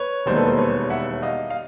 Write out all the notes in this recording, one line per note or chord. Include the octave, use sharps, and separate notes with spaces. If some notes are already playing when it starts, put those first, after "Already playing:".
Already playing: B4 C#5
E1 D#2 D#3 G3 C5
A4 B4
A#4 C5
B4 C#5
E5 F#5
D#5 F5
F5